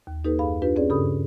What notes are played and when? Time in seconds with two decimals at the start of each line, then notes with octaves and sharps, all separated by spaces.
0.07 D#2
0.24 A#3 D#4 G4 A4 B4
0.39 F#2 G#4 F5 B5
0.62 D4 F4 G4 B4
0.76 C4 C#4 G#4 C#5 D5
0.90 G2 C#3 G4 A4 B5 D#6